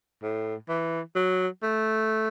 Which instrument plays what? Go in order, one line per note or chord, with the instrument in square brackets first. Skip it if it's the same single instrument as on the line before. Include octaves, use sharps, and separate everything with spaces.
[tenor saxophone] A2
E3
F#3
A3